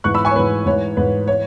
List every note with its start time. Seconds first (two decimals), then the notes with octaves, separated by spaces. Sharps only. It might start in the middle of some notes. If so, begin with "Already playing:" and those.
0.04 G#2 E3 C#6 F#6
0.14 B5 E6
0.25 G#5 C#6
0.31 C#5
0.35 G#2 E3 B4
0.66 G#2 E3 C#5
0.97 G#2 E3 B4
1.28 E3 C#5